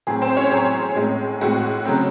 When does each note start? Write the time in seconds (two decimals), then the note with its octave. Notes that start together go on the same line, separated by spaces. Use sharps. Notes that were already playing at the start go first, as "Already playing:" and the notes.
0.07 A2 F#3 C4 G#4
0.21 C4 C5
0.37 C#4 C#5
0.52 A2 F#3 C4 G#4
0.97 A2 G#3 C4
1.41 A2 G#3 C4 F#4
1.85 C#3 F#3 A3 C4